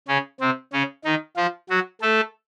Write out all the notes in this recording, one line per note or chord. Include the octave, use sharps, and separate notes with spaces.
C#3 C#4
C3 C4
C#3 C#4
D#3 D#4
F3 F4
F#3 F#4
A3 A4